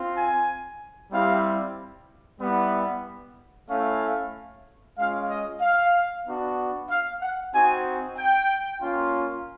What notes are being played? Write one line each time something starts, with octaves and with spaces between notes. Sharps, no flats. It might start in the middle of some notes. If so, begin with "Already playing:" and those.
Already playing: C4 F4
G#5
G3 C4 E4 G4 F5
G3 B3 E4 G4 F#5
A3 C#4 E4 F5
G#3 C#4 F4 F5
D#5
F5
B3 D4 F#4
F5
F#5
C4 D#4 F#4 G#5
G5
A#3 C#4 F4